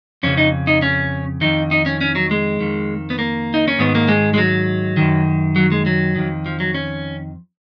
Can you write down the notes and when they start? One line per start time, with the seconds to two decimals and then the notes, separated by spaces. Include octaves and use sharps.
0.23 F2 C#3 C#4
0.37 D#4
0.67 D#4
0.82 C#4
1.41 F2 D#3 D#4
1.71 D#4
1.86 C#4
2.01 C#4
2.15 F#3
2.31 G#3
2.60 F2 D#3
3.10 B3
3.19 A#3
3.54 D#4
3.68 C#4
3.79 G#2 D#3 B3
3.95 A#3
4.08 G#3
4.34 G#3
4.38 F#3
4.97 F#2 D#3
5.56 F#3
5.72 G#3
5.86 F#3
6.16 F2 D#3
6.46 F3
6.60 F#3
6.74 C#4